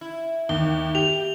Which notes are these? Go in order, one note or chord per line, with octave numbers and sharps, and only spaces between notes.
E4
D#2 G7
G4 F7